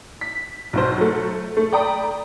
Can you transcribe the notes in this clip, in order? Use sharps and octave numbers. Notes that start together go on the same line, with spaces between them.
B6
B1 B2 C5
F#3 A3
A3
D5 G5 A#5 B5 D#6